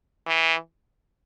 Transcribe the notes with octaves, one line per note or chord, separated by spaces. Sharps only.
E3